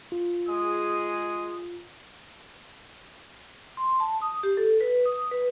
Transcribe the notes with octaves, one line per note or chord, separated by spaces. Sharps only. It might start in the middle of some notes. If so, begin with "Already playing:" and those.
F4
G#3 G#4 D#6
C6
A5
D#6
G4
A4
B4
D#6
B4